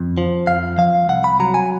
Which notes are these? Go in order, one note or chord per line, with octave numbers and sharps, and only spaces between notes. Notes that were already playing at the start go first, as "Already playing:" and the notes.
Already playing: F2
F3
F2 F5
F3 F5
C2 F#5
B5
F#3 A#5
G#5